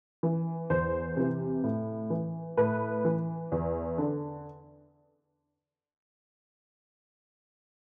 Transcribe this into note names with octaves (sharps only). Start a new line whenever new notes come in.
E3
E2 C5
C3 E3
A2
E3
A2 B4
E3
E2
D3